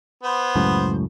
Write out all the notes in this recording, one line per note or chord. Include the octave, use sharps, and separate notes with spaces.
B3 C5
C#2 F#2 A2